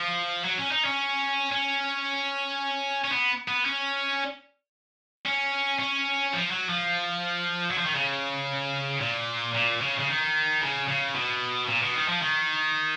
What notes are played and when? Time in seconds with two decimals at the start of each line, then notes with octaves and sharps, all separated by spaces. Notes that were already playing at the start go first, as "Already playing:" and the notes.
Already playing: F3
0.44 F#3
0.58 C#4
0.71 D#4
0.85 C#4
1.52 C#4
3.04 C#4
3.12 B3
3.48 B3
3.66 C#4
5.26 C#4
5.79 C#4
6.33 F3
6.51 F#3
6.69 F3
7.71 F#3
7.78 F3
7.86 D#3
7.94 C#3
9.01 A#2
9.55 A#2
9.81 C#3
9.99 C#3
10.08 D#3
10.61 C#3
10.88 C#3
11.15 B2
11.68 A#2
11.82 B2
11.95 D#3
12.09 F3
12.22 D#3